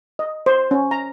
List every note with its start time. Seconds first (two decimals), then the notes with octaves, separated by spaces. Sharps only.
0.19 D#5
0.46 C5
0.71 C#4
0.91 A#5